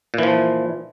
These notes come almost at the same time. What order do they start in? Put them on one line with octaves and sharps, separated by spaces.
A#2 E3 F3